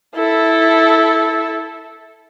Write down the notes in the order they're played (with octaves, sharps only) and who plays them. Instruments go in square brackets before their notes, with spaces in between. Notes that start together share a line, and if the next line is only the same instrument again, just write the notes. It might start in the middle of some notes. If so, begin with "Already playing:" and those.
[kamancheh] E4 A4